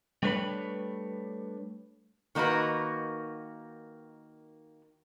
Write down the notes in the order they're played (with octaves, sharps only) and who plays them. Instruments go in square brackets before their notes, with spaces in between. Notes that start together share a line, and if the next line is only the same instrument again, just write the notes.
[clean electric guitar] G3 A3 D4 B4 C#5 B5
[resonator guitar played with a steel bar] D#3 A#3 D#4 F#4 B4